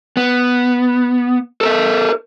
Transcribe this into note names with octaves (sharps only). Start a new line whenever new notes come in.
B3
A4 A#4 E5